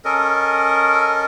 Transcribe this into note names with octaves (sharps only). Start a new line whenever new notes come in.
C#4 A4 A#4 D#5